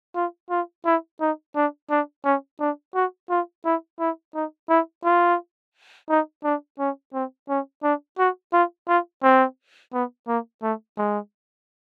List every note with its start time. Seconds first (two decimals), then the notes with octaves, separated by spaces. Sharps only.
0.16 F4
0.50 F4
0.85 E4
1.20 D#4
1.56 D4
1.90 D4
2.25 C#4
2.60 D4
2.95 F#4
3.30 F4
3.65 E4
3.99 E4
4.34 D#4
4.69 E4
5.04 F4
6.10 D#4
6.44 D4
6.79 C#4
7.14 C4
7.49 C#4
7.83 D4
8.19 F#4
8.53 F4
8.88 F4
9.23 C4
9.93 B3
10.28 A#3
10.63 A3
10.98 G#3